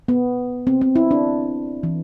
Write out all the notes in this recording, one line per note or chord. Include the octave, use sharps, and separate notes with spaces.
B3
C4
C4
E4
D4
E3